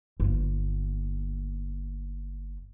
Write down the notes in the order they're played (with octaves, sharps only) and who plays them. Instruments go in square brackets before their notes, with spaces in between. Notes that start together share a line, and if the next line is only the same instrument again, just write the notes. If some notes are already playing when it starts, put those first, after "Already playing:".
[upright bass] G1 A#3